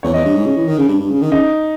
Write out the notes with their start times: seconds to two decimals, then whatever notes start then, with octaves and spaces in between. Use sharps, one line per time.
0.03 E2 C#5
0.14 E2 D#5
0.25 G2
0.36 G#2
0.46 C#3
0.56 E3
0.67 D#3
0.78 C#3
0.88 G2
0.99 G2
1.10 C#3
1.21 D#3
1.31 C#3 D#4